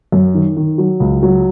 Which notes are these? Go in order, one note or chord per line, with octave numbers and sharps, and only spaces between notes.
F#2
D#3
D#3
F#3
C#2
F#3